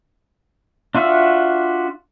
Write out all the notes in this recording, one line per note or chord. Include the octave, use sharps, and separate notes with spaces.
D4 F4 F#4 E5